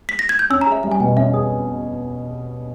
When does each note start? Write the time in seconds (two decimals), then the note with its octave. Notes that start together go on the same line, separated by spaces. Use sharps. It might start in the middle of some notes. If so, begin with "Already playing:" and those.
0.09 B6
0.19 A#6
0.29 G#6
0.39 G6
0.50 C#4 E6
0.61 A#5
0.67 G#4
0.72 E5
0.83 G3 E5
0.91 G#5
1.00 B2 G5
1.08 D#5
1.17 C#4 E5
1.33 G#4 D#6